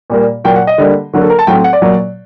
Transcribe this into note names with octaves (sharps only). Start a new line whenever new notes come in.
A#2 G3 A#3
A#2 F#3 A#3 G5
F#5
D#5
D3 G3 A#3
D3 F#3 A#3
A4
A#4
A5
A2 F#3 A3 C4 G5
F#5
D5
A#2 F#3 A#3